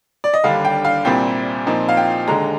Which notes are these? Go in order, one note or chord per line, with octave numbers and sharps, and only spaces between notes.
D5
D#5
D#2 D3 G3 D4 F5
G5
F5
C2 A#2 G3 C4 G5
A#2 F3 C4 D#4
F5
G5
D#2 D3 G#3 A#5